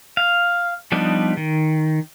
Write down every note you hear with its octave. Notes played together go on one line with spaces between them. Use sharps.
F5
F3 G3 B3 D4 D#4
D#3